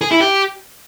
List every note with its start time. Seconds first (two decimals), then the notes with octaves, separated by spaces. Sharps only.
0.01 G#4
0.11 E4
0.21 G4